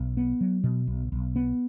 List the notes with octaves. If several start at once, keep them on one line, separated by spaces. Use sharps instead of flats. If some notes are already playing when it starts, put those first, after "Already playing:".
Already playing: B1
B3
F#3
B2
B1
B1
B3